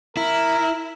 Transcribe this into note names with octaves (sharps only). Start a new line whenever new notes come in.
E4 A#4